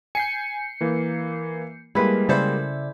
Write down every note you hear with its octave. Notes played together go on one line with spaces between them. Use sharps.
G#5 G6 C7 C#7
E3 A#3
G3 G#3 A#3 E4 B4
C#3 E4 A4 C5 D5 E5